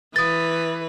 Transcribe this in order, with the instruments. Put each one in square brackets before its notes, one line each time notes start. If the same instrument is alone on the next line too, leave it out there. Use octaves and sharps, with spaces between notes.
[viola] E3 B4 [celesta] D#6 A6